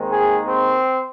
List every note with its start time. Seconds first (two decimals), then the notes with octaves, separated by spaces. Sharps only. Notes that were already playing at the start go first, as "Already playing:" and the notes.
Already playing: D#2 D#3 G#3 C4
0.08 G#4
0.46 C4